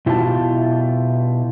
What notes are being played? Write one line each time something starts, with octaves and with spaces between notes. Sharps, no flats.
B2 E4 F4 G4 C5 A5